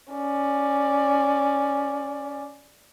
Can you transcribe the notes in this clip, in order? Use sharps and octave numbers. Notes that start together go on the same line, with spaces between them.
C#4 D5